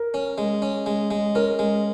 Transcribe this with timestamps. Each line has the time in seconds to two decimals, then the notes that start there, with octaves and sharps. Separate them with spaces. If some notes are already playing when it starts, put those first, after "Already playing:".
Already playing: A#4
0.14 C#4
0.38 G#3
0.62 C#4
0.86 G#3
1.11 G#3
1.35 C#4 A#4
1.59 G#3